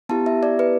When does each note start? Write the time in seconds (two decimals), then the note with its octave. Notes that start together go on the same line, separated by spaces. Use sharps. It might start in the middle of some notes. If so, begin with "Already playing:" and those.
0.09 B3 E4 G4 A5
0.26 E5
0.43 D5
0.59 B4